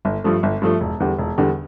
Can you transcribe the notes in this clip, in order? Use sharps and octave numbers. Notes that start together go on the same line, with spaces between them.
G1
G2 F3 A3
G1
G2 F3 A3
E1
E2 D3 G3
E1
E2 D3 G3